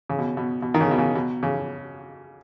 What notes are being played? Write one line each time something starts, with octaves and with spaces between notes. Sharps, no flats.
C#3
B2
B2
B2
D#3
C#3
B2
C#3
B2
C#3